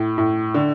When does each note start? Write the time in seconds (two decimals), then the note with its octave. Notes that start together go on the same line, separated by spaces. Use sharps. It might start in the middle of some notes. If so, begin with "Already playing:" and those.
Already playing: A2
0.18 A2
0.54 D3